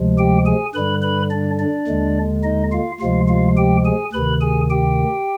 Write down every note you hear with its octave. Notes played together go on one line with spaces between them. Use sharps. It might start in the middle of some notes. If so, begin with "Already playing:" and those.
Already playing: D2 C3 F3 G#3
G4 G5
G#4 G#5
G2 D3 G3 B4 B5
B4 B5
D4 D5
D4 D5
D#2 D3 G#3
D#4 D#5
F4 F5
D2 C3 F3 G#3 F4 F5
F4 F5
G4 G5
G#4 G#5
D2 C3 D#3 B4 B5
G#4 G#5
G4 G5